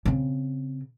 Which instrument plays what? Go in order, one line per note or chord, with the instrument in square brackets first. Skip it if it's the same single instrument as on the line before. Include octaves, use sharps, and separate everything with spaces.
[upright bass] C#3 C4